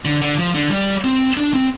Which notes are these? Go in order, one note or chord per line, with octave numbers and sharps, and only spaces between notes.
D3
D3
F3
D3
G3
C4
D4
C4